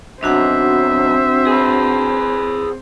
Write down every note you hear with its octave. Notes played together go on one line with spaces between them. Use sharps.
B1 C4 D4 F#4 C5 E5 F#5
G#4 B4